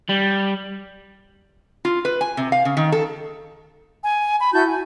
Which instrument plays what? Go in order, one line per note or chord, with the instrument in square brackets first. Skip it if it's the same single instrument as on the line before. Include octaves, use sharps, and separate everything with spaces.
[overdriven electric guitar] G3
[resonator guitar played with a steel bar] F4
B4
G#5
C3
F5
C#3
D#3
A4
[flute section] G#5
B5
E4 F#4 A5 G6
G#5